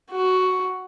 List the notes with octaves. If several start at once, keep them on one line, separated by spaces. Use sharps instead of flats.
F#4